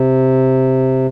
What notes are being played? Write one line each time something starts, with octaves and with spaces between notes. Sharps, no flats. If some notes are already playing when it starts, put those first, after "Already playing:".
Already playing: C3